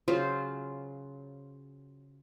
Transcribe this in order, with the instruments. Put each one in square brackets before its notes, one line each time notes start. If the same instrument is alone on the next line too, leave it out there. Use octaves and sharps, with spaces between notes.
[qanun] C#3 F#3 F4 C5